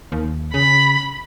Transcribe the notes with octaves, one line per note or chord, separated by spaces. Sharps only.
D#2
C#3 B5